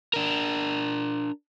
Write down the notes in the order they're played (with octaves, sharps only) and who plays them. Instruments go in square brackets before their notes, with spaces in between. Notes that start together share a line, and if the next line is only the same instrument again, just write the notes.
[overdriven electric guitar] D4 A#4